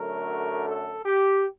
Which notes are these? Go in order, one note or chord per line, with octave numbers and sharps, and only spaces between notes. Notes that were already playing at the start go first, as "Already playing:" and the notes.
Already playing: F#2 D3 F#3 A3 A#4
A4
G4